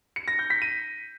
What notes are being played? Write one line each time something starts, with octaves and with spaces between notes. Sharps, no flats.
C#7
A#6
G6
B6
D#7